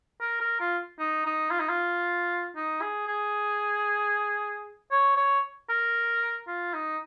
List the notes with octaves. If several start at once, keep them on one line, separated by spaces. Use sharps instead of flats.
A#4
A#4
F4
D#4
D#4
F4
D#4
F4
D#4
G#4
G#4
C#5
C#5
A#4
F4
D#4